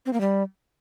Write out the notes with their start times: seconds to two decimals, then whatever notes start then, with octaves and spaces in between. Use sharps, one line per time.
0.06 C4
0.13 A#3
0.21 G3